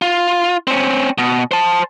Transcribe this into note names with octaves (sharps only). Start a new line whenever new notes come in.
F4
C4 C#4
B2
C5 A5